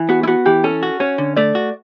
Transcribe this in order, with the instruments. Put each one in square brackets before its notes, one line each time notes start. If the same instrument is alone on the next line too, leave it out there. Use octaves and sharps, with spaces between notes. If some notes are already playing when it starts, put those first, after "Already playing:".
Already playing: [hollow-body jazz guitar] E3
[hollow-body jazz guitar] B3 [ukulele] F#4
[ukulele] E4
[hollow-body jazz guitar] B3 [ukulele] F#4
[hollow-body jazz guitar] E3 [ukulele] G4
[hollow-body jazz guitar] C#4 [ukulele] A4
[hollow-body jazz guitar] F#4
[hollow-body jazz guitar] C#4 [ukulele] C#5
[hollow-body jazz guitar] D3
[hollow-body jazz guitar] A3 [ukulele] D5
[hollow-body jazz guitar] F#4